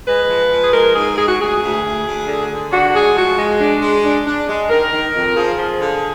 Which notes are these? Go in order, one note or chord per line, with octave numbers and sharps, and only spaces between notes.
G#3 B4
F3
F3
G#4
G#3 A#4
G#2 G#4
G#3 G#4
F#4
D2 G#4
D2
D2
D2
D3
D3
D4 F#4
G#3 G#4
F3 F#4
G#3
D4
G#3
D4
D4
G#3
D#3 A#4
D#3
F2
F3 G#4
F3
D3